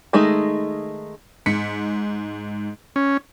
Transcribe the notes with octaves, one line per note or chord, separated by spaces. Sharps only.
D#3 G#3 A3 D#4
G#2 B6 C#7
C#4